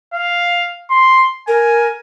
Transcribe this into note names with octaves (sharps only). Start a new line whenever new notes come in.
F5
C6
A#4 G#5